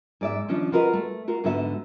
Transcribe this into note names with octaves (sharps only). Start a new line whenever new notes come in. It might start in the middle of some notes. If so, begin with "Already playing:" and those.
G#2 D5 E5
D#3 F3 C#4 D4
F4 F#4 A#4 B4 D#5
A3
F4 F#4 A#4
G#2 D3 B3 F#4 E5 A5